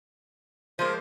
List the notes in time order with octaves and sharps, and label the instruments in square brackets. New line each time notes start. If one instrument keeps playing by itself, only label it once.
[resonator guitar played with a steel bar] F3 G#3 A#3 [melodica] C5